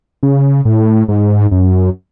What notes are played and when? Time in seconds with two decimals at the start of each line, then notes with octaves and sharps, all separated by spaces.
0.23 C#3
0.65 A2
1.08 G#2
1.51 F#2